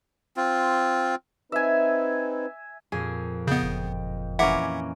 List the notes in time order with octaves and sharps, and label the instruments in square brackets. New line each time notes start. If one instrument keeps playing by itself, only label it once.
[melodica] C4 F4
[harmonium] C4 D#4 B4 [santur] E5 G#5
[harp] F2 A#2 [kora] G#4
[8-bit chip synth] C#3 B3 [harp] D#5 G5 G6
[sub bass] F#1
[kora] E3 A#3 C#4 [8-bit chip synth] E5 F#5 [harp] D6 G#6 A#6